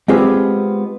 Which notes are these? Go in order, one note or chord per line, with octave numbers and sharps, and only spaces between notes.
G#3 B3 C4 F4 G4 G#4